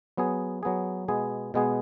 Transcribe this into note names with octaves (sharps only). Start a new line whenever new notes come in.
F#3 B3 G#4
F#3 B3 G#4
B2 G#3 B3 G#4
B2 G#3 B3 G#4